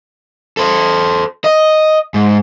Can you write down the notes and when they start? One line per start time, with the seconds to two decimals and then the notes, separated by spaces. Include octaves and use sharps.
0.57 A4 C5
1.44 D#5
2.14 G#2